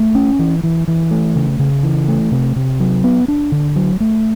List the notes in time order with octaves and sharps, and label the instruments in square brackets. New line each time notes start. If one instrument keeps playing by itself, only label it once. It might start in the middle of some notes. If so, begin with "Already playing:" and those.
Already playing: [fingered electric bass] A3
C#4
E3
E3
E3
A3
C#3
C#3
E3
A3
C3
C3
F#3
B3
D4
D3
F#3
A3